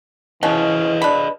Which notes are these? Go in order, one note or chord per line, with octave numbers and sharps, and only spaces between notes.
B2 E3 F3 C#4 G#4 B4 D#5
D4 B5